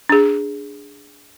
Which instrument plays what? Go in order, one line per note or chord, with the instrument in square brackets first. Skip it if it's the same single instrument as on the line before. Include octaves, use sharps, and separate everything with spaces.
[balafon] D4 G#4